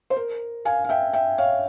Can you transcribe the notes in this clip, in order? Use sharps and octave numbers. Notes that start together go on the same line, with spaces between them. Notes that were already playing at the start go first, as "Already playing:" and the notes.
C5
A#4
F5 G#5
F5
E5 G5
E5 G5
C#5 F5